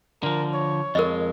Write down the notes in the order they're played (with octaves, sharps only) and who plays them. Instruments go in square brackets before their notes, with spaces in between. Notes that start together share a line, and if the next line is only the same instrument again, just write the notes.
[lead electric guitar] D3 F3 [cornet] A#4
[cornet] C#5
[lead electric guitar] F2 G#3 [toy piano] A#4 D#5